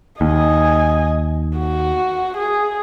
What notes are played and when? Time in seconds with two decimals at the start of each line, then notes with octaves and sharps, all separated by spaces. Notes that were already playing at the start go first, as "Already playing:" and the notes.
0.21 D#2 D#5 G#5
1.57 F#4
2.37 G#4